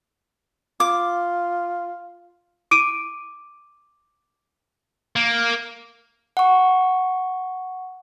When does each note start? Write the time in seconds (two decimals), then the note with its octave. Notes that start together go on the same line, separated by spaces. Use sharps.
0.80 F4 D6
2.71 D6 D7 D#7
5.16 A#3
6.37 F#5 C#6